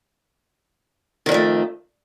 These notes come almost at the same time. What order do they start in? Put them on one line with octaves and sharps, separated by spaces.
D#3 G#2 F2 A3